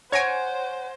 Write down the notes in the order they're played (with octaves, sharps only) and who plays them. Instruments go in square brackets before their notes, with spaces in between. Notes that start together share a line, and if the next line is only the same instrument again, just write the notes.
[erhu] C5 [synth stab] C#5 G#5 [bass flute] F#5 [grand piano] G#6 A#6 D7